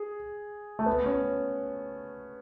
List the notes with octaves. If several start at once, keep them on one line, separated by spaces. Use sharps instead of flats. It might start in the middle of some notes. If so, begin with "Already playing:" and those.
Already playing: G#4
A3
B3
C#4